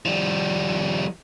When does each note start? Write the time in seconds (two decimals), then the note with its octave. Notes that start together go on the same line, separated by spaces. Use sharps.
0.05 F3 G3